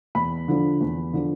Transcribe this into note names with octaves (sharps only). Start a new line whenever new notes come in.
E2 B5
D3 F3
E2
D3 F3